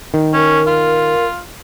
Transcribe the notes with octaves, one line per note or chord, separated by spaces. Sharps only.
D#3
C#4 A#4
F4